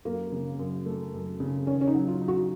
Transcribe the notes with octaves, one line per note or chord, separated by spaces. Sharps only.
F#2 A#3
C#3
F#2
A3
F#2
C#3
D#3 C#4
C#4
D#4
F#3
F4
D#4
F#4